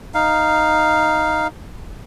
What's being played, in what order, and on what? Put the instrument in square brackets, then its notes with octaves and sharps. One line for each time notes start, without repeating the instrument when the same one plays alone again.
[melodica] D#4 F5